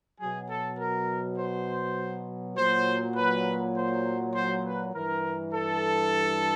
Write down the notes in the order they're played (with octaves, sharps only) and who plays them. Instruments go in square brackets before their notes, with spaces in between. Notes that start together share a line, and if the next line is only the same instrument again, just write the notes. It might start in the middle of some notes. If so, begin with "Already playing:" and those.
[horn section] B2 F#3 G#4
A4
A#4
C5
A#2 F#3 C5
B4
C5
C5
B4
G2 E3 A#4
A4